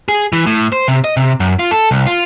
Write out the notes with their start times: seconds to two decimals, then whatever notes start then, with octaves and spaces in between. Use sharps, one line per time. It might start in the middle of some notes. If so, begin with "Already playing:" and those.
0.09 G#4
0.33 E3
0.47 A2
0.72 C5
0.88 C3
1.04 D#5
1.17 C3
1.40 F#2
1.59 F4
1.71 A4
1.91 C2
2.06 F4